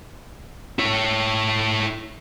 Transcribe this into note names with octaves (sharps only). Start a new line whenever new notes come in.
E4 C#5